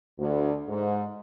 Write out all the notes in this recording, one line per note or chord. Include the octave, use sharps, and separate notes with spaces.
D2
G#2